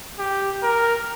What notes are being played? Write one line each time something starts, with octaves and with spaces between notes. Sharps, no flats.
G4
A#4